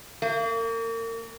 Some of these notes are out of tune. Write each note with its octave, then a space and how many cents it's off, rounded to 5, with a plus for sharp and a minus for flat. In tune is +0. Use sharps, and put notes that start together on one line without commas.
A#3 -35